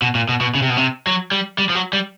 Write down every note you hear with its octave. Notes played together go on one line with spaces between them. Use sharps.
B2
A#2
B2
B2
C#3
C3
B2
C3
F#3
G3
G3
F3
F#3
G3